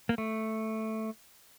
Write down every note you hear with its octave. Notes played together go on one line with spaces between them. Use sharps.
A#3
A3